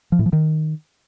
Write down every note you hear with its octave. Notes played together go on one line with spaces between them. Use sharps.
F3
A2
F3
D#3